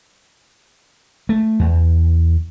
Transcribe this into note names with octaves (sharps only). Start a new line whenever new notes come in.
A3
E2